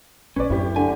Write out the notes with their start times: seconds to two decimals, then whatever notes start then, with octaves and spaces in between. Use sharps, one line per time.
0.36 A#1 C#4 B4 D5
0.50 F#2 A2 C4 G4
0.76 D3 G#5